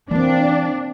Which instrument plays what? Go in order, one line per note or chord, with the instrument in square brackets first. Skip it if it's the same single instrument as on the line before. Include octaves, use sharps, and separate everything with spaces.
[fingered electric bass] E3 [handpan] A#3 C4 [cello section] D4